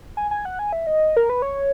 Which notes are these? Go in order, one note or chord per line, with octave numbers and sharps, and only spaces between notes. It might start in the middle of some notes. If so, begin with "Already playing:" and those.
G#5
G#5
F#5
G#5
E5
D#5
A#4
B4
C#5